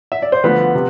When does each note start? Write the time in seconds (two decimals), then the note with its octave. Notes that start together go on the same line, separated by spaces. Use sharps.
0.12 E5
0.22 D5
0.32 C5
0.44 D2 D3 F3 A3 B3 B4
0.75 C3